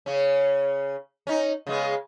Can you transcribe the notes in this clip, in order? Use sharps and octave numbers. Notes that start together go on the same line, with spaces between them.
C#3 C#4
C#4 D#4
C#3 G#3 B3